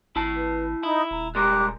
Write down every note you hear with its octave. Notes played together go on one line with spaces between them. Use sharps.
G#1 E4 A5
B4
D#4 E4 B5 D#6
D#1 A#5
G3 G#3 G4 A#4 D6 F#6